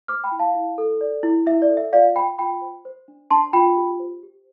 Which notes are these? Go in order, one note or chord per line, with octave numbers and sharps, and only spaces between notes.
C5 D6 F6
G5 B5
E4
F5 A5
E4
A4
D5
E4
E4 E5
D5
A4
E5
F4 D5 F5
C5 G5 B5
F4 G5 B5
C5
C5
D4
D4 A5 C6
F4 G5 B5
G4
C5
G4